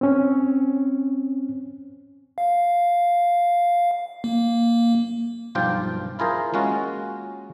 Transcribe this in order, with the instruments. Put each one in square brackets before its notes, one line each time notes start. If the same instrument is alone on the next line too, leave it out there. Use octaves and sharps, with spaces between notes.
[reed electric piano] C4 C#4
[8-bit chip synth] F5
A#3
[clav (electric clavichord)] B1 G2 F3 F4 D5 G5
E4 F4 G#4 A#4 C5
G#3 A#3 C#4 F4 F#4